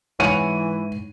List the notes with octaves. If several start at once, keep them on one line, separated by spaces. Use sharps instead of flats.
G#2 E3 C#5 F#5 G#5 D#7